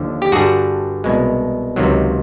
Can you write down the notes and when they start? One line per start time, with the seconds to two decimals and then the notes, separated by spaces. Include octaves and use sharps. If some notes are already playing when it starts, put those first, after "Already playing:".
Already playing: D#2 D3 F3
0.22 G4
0.32 G2 D3 G3 F#4 G#4
1.04 C2 B2 G#3
1.76 C#2 C3 D#3 F#3